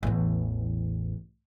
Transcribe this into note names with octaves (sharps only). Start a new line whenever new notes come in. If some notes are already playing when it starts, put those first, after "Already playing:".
A1 E2